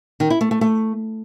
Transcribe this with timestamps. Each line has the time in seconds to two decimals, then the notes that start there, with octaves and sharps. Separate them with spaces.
0.20 D#3
0.30 E4
0.41 A3
0.51 A3
0.61 A3